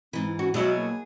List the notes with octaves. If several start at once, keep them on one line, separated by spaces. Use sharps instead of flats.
G#2 E3 C4
E4
C#4 F#4
B2 F#3 E4 F#4 G#4
A#3